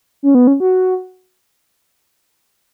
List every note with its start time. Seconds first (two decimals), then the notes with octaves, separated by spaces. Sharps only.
0.23 C#4
0.35 B3
0.47 C#4
0.60 F#4